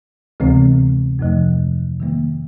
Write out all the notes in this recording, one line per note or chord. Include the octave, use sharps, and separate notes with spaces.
D2 C3 E3 G#3 C4
F2 C3 F3 A3
D#3 G3 A#3